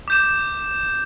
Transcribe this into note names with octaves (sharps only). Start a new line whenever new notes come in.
D6 G6 E7